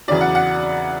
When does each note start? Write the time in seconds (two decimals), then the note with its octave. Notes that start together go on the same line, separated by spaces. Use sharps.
0.08 E2 C#3 F#3 D5
0.21 F#5
0.35 F#5